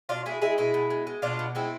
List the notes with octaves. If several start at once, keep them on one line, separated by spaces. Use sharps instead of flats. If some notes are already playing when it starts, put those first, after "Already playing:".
B2 D4 F4
G#3 E4 G#4
G#3 E4 G#4
B2 E4 G#4
B2
G#3
G#3
B2 D4 F4
B2
G#3 C4 E4